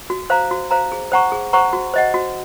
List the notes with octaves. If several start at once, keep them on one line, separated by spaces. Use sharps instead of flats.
F#4
C5 F5 A#5
F#4
C5 F5 A#5
G#4
C5 F#5 A#5 C#6
G#4
C5 F#5 A#5 C#6
F#4
C5 D#5 F#5
F#4